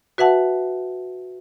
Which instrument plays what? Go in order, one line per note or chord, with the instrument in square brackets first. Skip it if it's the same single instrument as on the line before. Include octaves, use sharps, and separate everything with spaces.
[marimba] F#4 B4 E5 F#5 A5